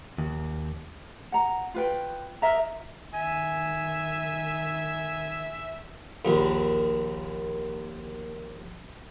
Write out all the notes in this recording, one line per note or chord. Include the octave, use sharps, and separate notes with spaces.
D#2
F#5 A#5
F4 B4 G5
A#4 D#5 E5 A#5
D#3 E5 G#5
A#1 D#2